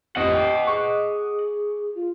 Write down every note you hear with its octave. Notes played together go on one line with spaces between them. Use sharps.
A1 F2 G4 D#5 F#5
G5 D6
G#4 C#6 D6
F4